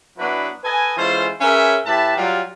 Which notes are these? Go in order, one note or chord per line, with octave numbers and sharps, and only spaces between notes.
F#3 B3 D4 E4 F#4 B4
A4 B4 D#5 G#5
E3 G#3 C#4 F4 A4 C5
C#4 G#4 A#4 B4 C#5 E5
A2 G4 B4 E5 A5
F#3 G3 F4